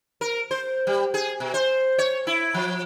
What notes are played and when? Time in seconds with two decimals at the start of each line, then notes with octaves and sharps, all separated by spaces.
0.21 A#4
0.51 C5
0.87 G3
1.14 G#4
1.40 B2
1.54 C5
1.98 C#5
2.27 E4
2.54 F3